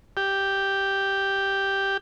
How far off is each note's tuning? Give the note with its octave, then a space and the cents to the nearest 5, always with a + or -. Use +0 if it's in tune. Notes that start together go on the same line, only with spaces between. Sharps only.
G4 +0